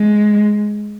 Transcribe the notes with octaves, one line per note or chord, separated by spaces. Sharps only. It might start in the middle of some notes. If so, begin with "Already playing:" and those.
Already playing: G#3